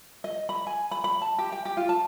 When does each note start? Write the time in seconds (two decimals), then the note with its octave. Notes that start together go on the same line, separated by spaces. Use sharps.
0.24 D#5
0.49 B5
0.67 G#5
0.91 B5
1.04 B5
1.22 A5
1.39 G4
1.52 G5
1.65 G4
1.77 F4
1.89 A5